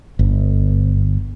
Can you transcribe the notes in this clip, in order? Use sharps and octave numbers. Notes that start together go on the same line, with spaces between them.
G1